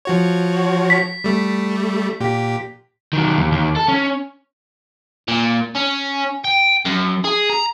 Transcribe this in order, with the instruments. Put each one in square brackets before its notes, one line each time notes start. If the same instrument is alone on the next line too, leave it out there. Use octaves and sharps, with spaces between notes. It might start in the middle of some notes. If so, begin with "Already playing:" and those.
[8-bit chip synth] F3 F#4 C#5
[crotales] B6
[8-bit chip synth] G3 A3
A#2 G4
[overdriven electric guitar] D#3 F#3
D#2
D#2
A4
C#4
A#2
C#4
G5
F#2
G#4
A#5